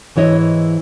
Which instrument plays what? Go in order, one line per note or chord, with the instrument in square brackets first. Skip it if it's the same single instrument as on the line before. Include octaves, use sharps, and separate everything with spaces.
[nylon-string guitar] G#2 E3 E4 C#5 D#5